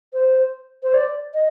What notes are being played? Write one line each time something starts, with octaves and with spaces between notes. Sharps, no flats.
C5
C5
D5
D#5